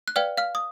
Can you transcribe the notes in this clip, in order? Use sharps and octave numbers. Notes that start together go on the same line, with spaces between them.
F#6
B4 D5 F5 G5 F6
F5 F6
D#6